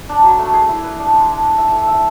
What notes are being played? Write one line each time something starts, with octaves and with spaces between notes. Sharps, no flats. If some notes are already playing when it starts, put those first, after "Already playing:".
D4
F#3
A3
G#4
E4
B4
D4
G#3
D4
D4
E5
A4
E5